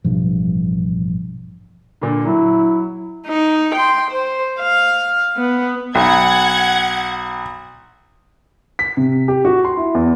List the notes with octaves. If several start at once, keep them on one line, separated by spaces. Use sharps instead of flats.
A1 G2 B2 F3
A#2 D3
F#3 E4
D#4
G5 C6
C5
F5
B3
B1 F#5 G#6
B6
C3
G4
F#4
C6
E4
E2